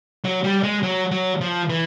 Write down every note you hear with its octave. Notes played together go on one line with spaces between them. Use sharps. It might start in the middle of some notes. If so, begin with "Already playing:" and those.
F#3
G3
G#3
F#3
F#3
F3
E3